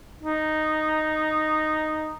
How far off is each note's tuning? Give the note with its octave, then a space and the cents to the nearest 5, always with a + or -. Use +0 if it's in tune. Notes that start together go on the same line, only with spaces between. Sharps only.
D#4 -5